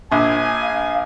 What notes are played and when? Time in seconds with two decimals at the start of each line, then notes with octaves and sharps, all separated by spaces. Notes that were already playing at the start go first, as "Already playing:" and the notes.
0.12 A#1 G#5
0.63 F5